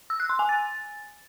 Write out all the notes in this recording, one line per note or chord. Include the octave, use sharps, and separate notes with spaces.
E6
F#6
C6
G#5
A6